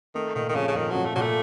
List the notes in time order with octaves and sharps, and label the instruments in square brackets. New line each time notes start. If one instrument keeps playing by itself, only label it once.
[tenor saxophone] D#3 [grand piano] A3
[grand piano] A#2 [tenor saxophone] D#3
[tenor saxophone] D#3
[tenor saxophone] C#3 [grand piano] F3
[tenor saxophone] C#3
[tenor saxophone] D#3 [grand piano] F3
[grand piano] F3 [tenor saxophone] F#3
[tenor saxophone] A3
[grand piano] A#2 [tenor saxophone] F#3
[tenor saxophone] A3